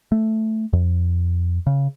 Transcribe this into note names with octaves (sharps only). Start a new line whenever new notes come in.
A3
F2
C#3